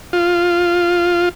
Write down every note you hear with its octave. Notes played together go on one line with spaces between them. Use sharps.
F4